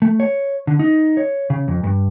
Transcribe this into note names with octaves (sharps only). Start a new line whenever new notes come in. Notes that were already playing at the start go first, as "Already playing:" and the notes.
A3
C#5
D3
D#4
C#5
C#3
F2
G2